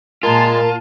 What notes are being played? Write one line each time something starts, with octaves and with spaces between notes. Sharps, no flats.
A#2 G#3 F4 A#4 G#5 A5 C6